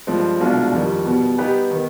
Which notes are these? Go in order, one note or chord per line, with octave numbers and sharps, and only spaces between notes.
G2 F3 G#3 C4
C2 B2 G#3 D4 F4
F2 D#3 G3
B2 G3 B3
G3 B3 D#4 G4 B4
D#3 B3